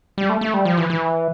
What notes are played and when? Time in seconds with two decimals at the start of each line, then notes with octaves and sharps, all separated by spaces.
0.18 G3
0.29 A3
0.41 A3
0.54 G3
0.65 F3
0.77 E3
0.90 E3